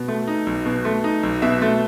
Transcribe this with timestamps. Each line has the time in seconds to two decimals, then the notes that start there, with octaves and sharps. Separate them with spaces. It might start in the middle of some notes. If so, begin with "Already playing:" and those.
Already playing: B2
0.08 A3
0.27 D#4
0.46 B1
0.66 B2
0.85 A3
1.04 D#4
1.23 B1
1.42 B2 E5
1.62 A3